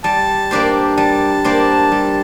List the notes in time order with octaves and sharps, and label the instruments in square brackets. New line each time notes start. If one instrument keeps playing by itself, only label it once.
[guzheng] G3 [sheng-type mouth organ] A5
[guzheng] A#3 D4 G4 C5
[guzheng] G3 [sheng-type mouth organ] A5
[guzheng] A#3 D4 G4 C5
G3